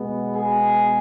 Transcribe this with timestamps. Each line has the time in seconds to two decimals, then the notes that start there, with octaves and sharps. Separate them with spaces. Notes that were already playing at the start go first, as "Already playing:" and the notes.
Already playing: B2 G#3 B3
0.36 G#4